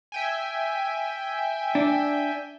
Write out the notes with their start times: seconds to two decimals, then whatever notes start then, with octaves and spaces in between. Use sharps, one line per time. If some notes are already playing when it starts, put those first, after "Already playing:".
0.12 E5 G5 G#5
1.75 D4